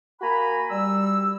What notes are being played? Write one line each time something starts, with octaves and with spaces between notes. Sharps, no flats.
A#3 F#4 G#5 A#5 B5
G3 E6